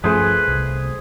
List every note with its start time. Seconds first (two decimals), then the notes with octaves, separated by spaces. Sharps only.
0.04 G2 F3 A3 C#4 G#4 B4 C5
0.48 C2